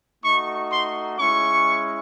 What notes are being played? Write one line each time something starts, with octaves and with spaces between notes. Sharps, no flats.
A3 D#4 F#4 C#6
C6
G#3 C#4 E4 C#6